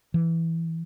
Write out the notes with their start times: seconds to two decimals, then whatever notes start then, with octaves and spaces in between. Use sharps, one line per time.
0.14 E3